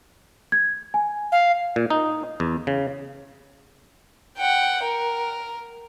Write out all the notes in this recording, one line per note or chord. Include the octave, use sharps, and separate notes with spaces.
G#6
G#5
F5
A#2
D#4
E2
C#3
F#5 G5
A#4